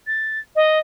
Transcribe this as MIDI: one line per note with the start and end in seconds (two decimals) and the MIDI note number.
0.07 0.39 93
0.56 0.79 75